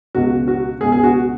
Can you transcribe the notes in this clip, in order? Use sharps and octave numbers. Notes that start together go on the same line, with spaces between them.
C#2 B2 F#4
F#4
C#2 B2 G#4
G#4
F#4